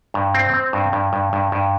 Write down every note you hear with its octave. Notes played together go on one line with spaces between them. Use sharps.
G2
C4
C4
G2
G2
G2
G2
G2